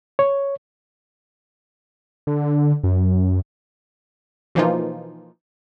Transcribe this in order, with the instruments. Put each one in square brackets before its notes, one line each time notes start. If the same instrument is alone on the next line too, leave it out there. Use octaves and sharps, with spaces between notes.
[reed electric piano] C#5
[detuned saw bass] D3
F#2
[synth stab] B2 E3 F3 A#3 D#4 F4